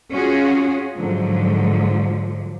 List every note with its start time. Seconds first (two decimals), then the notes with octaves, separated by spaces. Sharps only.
0.13 C#4 F4 F#4 G#4
0.96 G#2 D3 F3 F#3